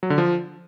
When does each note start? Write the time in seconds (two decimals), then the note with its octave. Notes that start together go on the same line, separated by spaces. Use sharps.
0.03 F#3
0.10 D3
0.18 F3